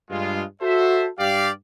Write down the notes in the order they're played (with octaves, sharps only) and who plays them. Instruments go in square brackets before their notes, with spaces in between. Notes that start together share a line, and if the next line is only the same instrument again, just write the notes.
[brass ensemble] G2 G#3 F4
F#4 A4 C5 E5
G2 G4 D5 F5